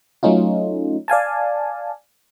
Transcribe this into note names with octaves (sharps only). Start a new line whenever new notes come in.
F#3 A3 C#4 D#4 F4
D5 F5 G#5 A5